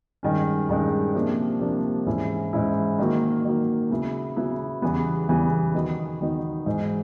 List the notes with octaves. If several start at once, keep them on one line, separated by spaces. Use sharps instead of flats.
G2 D#3 G#3 C#4
G2 D#3 G#3 C#4
C3 F3 A#3 D4
C3 F3 A#3 D4
G#2 E3 G#3 C#4 E4
G#2 E3 G#3 C#4 E4
D#3 F#3 A#3
D#3 F#3 A#3
C#3 F#3 B3 E4
C#3 F#3 B3 E4
E2 C#3 E3 G3 B3
E2 C#3 E3 G3 B3
D#3 F#3 B3 D#4
D#3 F#3 B3 D#4
G#2 E3 G#3